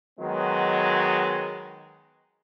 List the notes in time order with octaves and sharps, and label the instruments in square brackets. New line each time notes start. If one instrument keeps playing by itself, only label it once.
[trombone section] D#3 F#3 G#3 B3